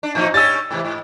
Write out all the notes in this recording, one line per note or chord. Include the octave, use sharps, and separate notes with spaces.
D4
A2 F3 D#4
G3 C#4 G4 E6 A6
G#2 C3 E3
G#2